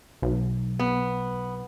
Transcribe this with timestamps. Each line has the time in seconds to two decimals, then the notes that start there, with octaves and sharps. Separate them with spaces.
0.22 B1
0.79 B3